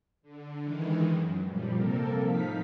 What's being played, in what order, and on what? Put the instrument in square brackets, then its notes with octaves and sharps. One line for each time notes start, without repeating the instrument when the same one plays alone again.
[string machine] D3
D#3 E3 G#3
F#2
A#2 F3 G3
C3 A#3 A4 A#4
A2 F3 D#4 F5 B6